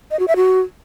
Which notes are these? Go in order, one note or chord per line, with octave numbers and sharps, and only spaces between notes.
D#5
F#4
E5
F#4